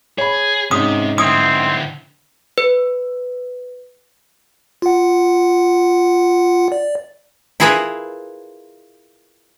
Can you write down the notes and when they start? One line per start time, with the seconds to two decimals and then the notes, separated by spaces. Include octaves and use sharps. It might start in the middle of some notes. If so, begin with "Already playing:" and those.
0.18 G#4 C#5 B5
0.71 G#2 C3 C#4 D#4 D#6
1.18 D3 C4 E4 D#6
2.58 B4
4.82 F4 F#5
6.72 D5
7.60 E4 F4 G#4 A#4 B4